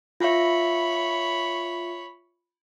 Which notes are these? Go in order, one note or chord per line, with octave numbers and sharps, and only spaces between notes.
F4 C#5 E5 B5